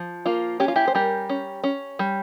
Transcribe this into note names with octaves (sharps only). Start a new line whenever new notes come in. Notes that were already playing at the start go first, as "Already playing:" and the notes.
Already playing: F3
A#3 F4
C#4 G4
F4
E4 G4
C5
G3 G4 A#4
C#4
C#4
G3